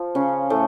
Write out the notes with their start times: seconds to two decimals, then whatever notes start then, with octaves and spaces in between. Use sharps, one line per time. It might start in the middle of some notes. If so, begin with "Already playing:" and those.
Already playing: F3 F4
0.15 C#3 C#4
0.50 A2 A3